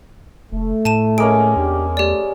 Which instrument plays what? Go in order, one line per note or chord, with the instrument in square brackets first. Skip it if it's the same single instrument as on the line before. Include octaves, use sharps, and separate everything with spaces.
[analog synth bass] F1 [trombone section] A3
[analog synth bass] A2 [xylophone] A5 D#7 E7
[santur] G#3 A#3 C#4 [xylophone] D7
[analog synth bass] E2 [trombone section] D4 G4
[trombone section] A3 [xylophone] G4 D5